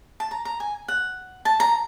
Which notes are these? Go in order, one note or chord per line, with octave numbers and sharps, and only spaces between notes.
A5
A#5
A#5
G#5
F#5
A5
A#5